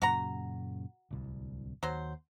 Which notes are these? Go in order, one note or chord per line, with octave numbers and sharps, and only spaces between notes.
F#2 A#2 C#3 F#4 F#5 A#5
D1 C2
D#2 F#3 C5